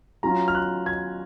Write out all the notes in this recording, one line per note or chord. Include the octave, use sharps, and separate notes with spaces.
F#3 C#4 F4 A#5
F6
F#6
G#6